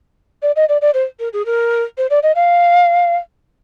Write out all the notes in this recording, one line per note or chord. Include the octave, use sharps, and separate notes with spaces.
D5
D#5
D5
D5
C5
A#4
G#4
A#4
C5
D5
D#5
F5